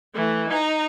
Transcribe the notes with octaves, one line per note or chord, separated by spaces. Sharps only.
E3 A3
D#4 A#5